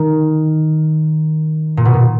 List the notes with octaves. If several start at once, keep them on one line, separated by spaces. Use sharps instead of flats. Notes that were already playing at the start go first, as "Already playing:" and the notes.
Already playing: D#3
A#2
B2
A#2